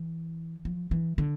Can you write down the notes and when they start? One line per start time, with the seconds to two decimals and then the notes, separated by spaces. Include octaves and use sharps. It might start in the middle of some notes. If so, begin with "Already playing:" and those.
Already playing: E3
0.65 F3
0.91 E3
1.18 D3